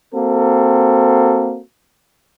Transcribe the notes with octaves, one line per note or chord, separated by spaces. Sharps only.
A#3 C4 F#4 A4